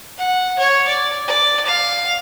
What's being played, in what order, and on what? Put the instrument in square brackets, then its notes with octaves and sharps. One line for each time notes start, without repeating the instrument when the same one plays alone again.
[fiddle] F#5
C#5
D5
D5
F5